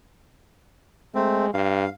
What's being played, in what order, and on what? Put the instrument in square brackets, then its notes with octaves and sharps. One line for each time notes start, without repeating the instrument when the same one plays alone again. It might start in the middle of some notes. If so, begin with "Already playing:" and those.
[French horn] G#3 [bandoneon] A3 C4
[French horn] G2 [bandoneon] F5